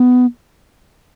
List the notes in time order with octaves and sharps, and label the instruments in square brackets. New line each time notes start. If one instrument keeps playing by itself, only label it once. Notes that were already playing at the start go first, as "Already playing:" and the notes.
Already playing: [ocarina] B3